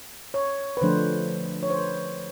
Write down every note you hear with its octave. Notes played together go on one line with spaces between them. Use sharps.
C#5
B4
D3 F3 A3 D4 C5
C#5
C5
B4